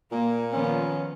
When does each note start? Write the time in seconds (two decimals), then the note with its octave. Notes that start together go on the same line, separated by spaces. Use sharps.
0.12 A#2 A#3
0.53 D#3 F3 B3 C#4